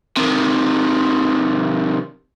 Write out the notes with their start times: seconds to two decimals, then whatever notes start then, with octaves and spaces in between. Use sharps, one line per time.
0.17 C3 D#3